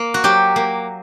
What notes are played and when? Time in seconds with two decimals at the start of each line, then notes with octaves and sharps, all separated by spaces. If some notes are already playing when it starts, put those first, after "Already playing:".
Already playing: A#3
0.14 F#4
0.24 F#3 G4
0.56 A#3